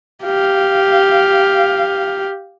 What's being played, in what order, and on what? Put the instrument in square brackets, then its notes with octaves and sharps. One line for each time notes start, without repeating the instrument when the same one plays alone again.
[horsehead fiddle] G4 F5